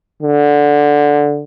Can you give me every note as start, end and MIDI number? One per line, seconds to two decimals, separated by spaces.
0.23 1.44 50